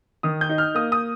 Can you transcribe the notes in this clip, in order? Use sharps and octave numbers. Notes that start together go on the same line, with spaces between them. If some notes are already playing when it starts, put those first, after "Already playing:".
D#3 D#6
G6
D#4
F6
A#3 D#6
D#6